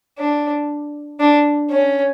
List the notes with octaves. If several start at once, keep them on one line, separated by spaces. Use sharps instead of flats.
D4
D4
C#4